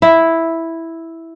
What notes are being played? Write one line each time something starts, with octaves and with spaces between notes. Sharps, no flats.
E4